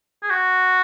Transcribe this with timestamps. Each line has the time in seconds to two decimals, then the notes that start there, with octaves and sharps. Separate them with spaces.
0.23 G#4
0.30 F#4